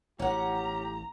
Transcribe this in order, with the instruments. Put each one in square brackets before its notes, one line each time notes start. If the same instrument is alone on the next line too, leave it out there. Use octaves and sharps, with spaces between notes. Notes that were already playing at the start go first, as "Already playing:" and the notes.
[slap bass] A1 [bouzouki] C#4 F#5 [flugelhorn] G4 [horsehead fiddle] A#5